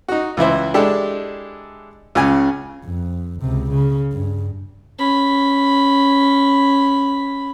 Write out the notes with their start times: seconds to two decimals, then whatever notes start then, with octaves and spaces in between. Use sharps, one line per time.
0.08 D#4 F#4
0.37 C#2 E3 E4 C5
0.74 G#3 D4 E4 G4 A4
2.15 C#2 C#3 G#5
2.85 F2
3.41 C#2 C3
3.71 C#3
4.12 G2
4.99 C#4 B5